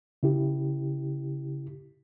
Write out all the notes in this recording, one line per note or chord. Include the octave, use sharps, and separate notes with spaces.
C#3 E4 G4